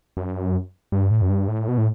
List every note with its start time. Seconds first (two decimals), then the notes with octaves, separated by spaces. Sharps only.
0.17 F#2
0.92 G2
1.11 A2
1.22 F#2
1.30 G2
1.48 A2
1.68 B2
1.78 A2